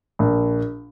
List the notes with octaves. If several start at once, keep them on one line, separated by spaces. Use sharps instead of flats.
A#1